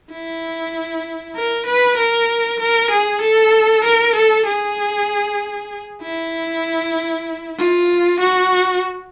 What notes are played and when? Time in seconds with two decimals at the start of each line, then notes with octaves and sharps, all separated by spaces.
0.11 E4
1.36 A#4
1.67 B4
1.98 A#4
2.60 A#4
2.91 G#4
3.22 A4
3.85 A#4
4.16 A4
4.46 G#4
6.02 E4
7.58 F4
8.20 F#4